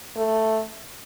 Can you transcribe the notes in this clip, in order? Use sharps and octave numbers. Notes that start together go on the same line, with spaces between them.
A3